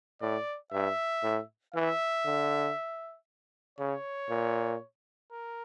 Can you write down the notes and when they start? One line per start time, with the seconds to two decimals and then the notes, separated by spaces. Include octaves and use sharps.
0.22 A2 D5
0.72 G2 E5
1.23 A2
1.74 E3 E5
2.25 D3
3.79 C#3 C#5
4.30 A#2
5.31 A#4